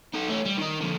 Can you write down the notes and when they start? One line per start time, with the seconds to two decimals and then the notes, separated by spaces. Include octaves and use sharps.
0.14 D#4 A4
0.29 A3 C#4
0.46 G3
0.58 D#3 D#4
0.81 F2 D3